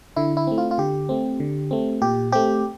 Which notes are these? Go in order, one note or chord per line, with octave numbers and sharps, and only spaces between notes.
D3 E4
E4
A3 C4
F4
F4
D3 G4
A3 C4
D3
A3 C4
A#2 G4
A3 C4 G4